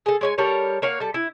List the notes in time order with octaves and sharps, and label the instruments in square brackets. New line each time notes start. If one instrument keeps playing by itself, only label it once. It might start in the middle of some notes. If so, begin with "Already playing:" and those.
[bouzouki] G#4 A4
G#3 C#5 G#5
G3 A4 A#4 C#5
A#3 C#5 F5 F#5
G3 A4
E4